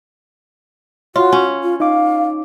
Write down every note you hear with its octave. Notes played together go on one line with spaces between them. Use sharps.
F4 F#4 C#5
C#4
F4
D#4 F5 D6